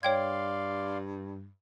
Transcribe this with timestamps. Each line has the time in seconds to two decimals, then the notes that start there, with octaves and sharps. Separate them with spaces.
0.03 G2 C#5 D5 F5 G5 C6 G#6